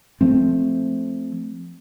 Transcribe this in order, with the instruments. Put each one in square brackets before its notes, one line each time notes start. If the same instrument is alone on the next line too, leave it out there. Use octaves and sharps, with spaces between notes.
[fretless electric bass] F3 A3 C4